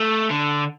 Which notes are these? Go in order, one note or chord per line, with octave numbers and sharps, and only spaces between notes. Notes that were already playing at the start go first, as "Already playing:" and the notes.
Already playing: A3
D3